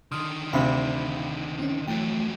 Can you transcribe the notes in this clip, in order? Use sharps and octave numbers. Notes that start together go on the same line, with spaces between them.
D3 D#3 C6 D#6 F6
D2 C3 F5 G5 B5
C4 C#4
F2 E3 F#3 A3 G5